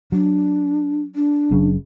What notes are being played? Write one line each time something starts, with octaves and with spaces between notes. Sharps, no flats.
F#3 D4
D4
F#1 F#2 C#3